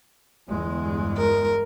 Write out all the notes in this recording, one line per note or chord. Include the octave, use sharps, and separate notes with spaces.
G1 E2 G#3
A#4